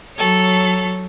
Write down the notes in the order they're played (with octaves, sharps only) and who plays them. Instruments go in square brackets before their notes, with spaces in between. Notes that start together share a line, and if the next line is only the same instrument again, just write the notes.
[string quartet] F#3 A4 C#5